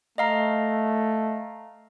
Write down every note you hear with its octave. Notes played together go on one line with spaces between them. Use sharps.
A3 D#5 F5 A#5